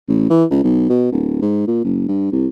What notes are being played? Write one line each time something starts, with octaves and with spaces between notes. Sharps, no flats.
A1
E3
C#2
B1
B2
D1
G#2
A#2
F#1
G2
C2